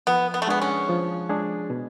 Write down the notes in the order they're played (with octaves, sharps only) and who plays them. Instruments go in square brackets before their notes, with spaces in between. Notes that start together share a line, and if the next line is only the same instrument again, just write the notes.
[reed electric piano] F3 [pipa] B3
[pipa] B3
A3
[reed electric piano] G#3 D4 G#4 [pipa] B3
[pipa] C#4
[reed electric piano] F3
G#3 D4 G#4
B2